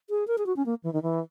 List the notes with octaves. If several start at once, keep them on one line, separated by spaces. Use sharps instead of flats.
G#4
A#4
G#4
F#4
C#4
A#3
E3
D#3
E3